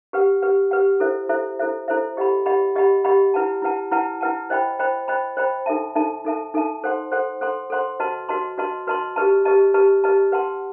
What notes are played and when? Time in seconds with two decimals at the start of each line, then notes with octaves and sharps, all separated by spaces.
0.13 G4 B4 F#5
0.42 G4 B4 F#5
0.71 G4 B4 F#5
1.00 E4 A4 C5 E5
1.29 E4 A4 C5 E5
1.59 E4 A4 C5 E5
1.88 E4 A4 C5 E5
2.17 G4 D#5 F#5 B5
2.46 G4 D#5 F#5 B5
2.75 G4 D#5 F#5 B5
3.04 G4 D#5 F#5 B5
3.34 E4 B4 F#5 A5
3.62 E4 B4 F#5 A5
3.91 E4 B4 F#5 A5
4.21 E4 B4 F#5 A5
4.50 C5 D#5 G5 B5
4.79 C5 D#5 G5 B5
5.08 C5 D#5 G5 B5
5.37 C5 D#5 G5 B5
5.66 D#4 A4 E5 A5
5.95 D#4 A4 E5 A5
6.25 D#4 A4 E5 A5
6.54 D#4 A4 E5 A5
6.84 A4 C5 F#5 C6
7.12 A4 C5 F#5 C6
7.41 A4 C5 F#5 C6
7.70 A4 C5 F#5 C6
8.00 F#4 B4 D#5 A5 C6
8.29 F#4 B4 D#5 A5 C6
8.58 F#4 B4 D#5 A5 C6
8.87 F#4 B4 D#5 A5 C6
9.16 G4 B4 D#5 A5
9.45 G4 B4 D#5 A5
9.74 G4 B4 D#5 A5
10.04 G4 B4 D#5 A5
10.32 B4 F#5 A5 C6